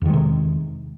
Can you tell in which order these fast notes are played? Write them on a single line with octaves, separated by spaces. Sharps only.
E2 D#3 G#3 C3